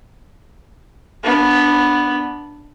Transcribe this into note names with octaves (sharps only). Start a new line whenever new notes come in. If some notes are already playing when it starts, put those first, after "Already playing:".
B3 D4